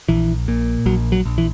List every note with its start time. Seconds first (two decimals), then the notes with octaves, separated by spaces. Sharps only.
0.09 A#1 E3
0.48 A#2
0.86 A#1 F#3
1.12 F#3
1.25 A#1
1.38 E3